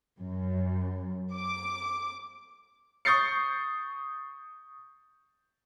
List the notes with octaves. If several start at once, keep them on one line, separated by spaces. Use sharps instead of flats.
F#2
D6
C#6 D#6 G6 A6 C7 C#7